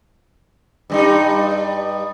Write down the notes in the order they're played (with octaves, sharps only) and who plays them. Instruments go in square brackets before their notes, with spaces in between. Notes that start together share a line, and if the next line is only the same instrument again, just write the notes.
[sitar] G2 G3 D#4